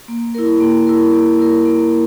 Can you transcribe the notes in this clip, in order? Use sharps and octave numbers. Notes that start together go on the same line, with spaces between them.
A#3
E4 A#4
A#3
E4 A#4
A#3
E4 A#4
A#3